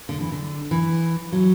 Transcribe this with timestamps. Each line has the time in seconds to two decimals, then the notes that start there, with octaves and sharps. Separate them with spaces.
0.09 D3
0.21 E3
0.32 D3
0.71 E3
1.32 F#3